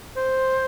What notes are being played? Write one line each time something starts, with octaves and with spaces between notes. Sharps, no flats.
C5